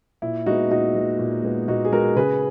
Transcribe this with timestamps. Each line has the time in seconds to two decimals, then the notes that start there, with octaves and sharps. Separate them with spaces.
0.22 A#2 E4
0.46 G#3 B3 D#4 F#4
0.71 A#2 D#4 F#4
0.95 G#3 B3
1.19 A#2
1.43 G#3 B3
1.68 A#2 D#4 F#4
1.85 G#4
1.92 G#3 B3 F#4 A#4
2.16 C#3 G#4 B4